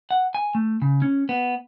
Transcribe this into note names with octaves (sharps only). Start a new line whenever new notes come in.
F#5
G#5
A3
C#3
C#4
B3